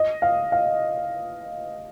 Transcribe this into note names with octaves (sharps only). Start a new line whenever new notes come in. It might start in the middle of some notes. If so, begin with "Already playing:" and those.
Already playing: D#5
F5
F5